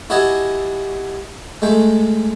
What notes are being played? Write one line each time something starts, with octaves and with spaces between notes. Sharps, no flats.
E4 F#4 G4 D#5 G#5 A5
G#3 A3 G5